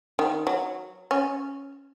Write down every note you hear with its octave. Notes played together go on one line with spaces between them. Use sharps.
D#3
F#3
C#4